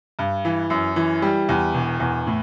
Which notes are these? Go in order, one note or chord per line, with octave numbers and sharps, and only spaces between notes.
G2
E3
F#2
E3
G3
E2
E1
E2
A2